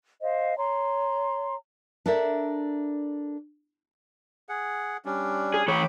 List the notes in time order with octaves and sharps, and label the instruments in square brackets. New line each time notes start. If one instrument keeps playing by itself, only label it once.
[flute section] C5 D#5 F5
C#5 A#5 C6
[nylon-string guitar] D4 A4 A#4 D5 E5
[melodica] G#4 F#5
G3 C#4 D4
[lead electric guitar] G#4
[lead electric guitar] E3 C#5 [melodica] G5 B5 D6